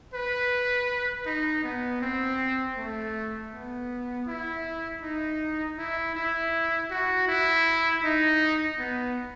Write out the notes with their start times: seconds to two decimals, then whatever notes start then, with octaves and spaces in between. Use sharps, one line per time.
0.14 B4
1.26 D#4
1.64 B3
2.01 C4
2.77 A3
3.52 B3
4.27 E4
5.02 D#4
5.78 E4
6.15 E4
6.90 F#4
7.27 E4
8.03 D#4
8.78 B3